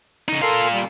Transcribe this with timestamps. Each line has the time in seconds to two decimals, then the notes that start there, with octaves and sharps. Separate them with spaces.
0.28 C#3 D#4
0.42 A#2 A4 A#4 F5 C6
0.73 G3